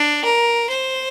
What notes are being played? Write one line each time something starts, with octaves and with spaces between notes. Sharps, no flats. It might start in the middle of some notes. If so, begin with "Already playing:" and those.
Already playing: D4
A#4
C5